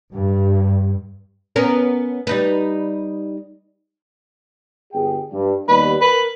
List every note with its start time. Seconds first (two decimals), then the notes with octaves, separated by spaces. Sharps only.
0.13 G2
1.56 B3 C#4 A#4
2.27 G3 D#4 B4
4.93 G1 G#4 G5
5.33 G2
5.69 D#2 B2 G3 B4
6.01 A#4 B4